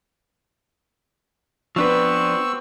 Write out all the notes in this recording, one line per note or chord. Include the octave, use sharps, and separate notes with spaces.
F3 B3 C4 D4 B4 C#6 E6